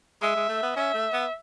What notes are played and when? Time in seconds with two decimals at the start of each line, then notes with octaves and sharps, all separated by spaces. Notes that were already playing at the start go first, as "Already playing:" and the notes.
0.22 G#3 E5
0.36 G#3
0.49 A3
0.63 B3
0.77 C#4 E5
0.94 A3
1.13 B3